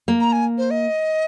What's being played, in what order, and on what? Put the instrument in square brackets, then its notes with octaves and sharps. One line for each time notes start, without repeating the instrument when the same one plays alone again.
[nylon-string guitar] A#3
[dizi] A#5
G#5
C5
D#5